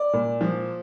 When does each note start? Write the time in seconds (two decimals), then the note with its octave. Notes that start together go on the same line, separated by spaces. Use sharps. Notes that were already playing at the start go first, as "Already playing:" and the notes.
Already playing: D5
0.13 A#2
0.41 F3